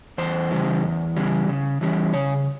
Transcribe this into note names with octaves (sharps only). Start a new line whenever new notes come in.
E2 C5
C#3 E3 G3
E2
C#3 E3 G3
C#3
E3 G3 C#4
C#3 C#5